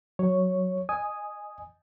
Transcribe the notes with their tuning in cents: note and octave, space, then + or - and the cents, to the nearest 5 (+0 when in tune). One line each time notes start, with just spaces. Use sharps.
F#3 +0 C#5 +0
D#5 -20 G#5 +0 D#6 +0